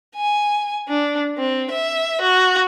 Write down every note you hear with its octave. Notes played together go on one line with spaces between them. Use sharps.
G#5
D4
C4
E5
F#4